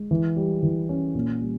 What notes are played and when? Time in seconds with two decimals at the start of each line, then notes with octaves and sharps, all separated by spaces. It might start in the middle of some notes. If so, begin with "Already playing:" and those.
Already playing: G#3
0.11 E3
0.36 G3
0.63 E3
0.89 C#4
1.15 A#2
1.41 G3